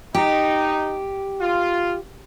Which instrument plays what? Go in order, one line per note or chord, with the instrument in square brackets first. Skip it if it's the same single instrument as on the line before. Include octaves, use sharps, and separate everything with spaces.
[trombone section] D#4 [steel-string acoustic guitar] G4
[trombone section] F4